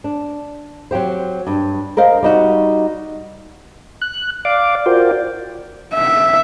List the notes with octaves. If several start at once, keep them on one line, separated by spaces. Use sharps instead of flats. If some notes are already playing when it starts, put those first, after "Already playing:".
D4
F#3 C4 G4 C5
G2
A#4 C5 D#5 F5
G3 D#4 F#4
F#6
D5 F5 D6
F4 F#4 A#4 C5 D5 G5
E5